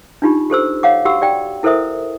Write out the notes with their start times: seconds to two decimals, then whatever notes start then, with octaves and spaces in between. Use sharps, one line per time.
0.22 D4 D#4 F4 G4 B5
0.50 G4 A4 C5 E6
0.83 C#5 F5 F#5 D6
1.05 F#4 G4 F#5 E6
1.21 G4 D5 G5
1.63 E4 A4 A#4 C5 E5 D#6